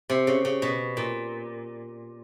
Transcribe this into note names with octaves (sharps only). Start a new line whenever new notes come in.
C3
C#3
C#3
B2
A#2